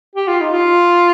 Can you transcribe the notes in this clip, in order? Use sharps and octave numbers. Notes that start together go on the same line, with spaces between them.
G4
F4
D#4
F4